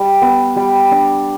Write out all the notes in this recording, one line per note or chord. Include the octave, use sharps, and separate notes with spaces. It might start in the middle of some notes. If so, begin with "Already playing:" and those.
Already playing: G3
B3
G3
D4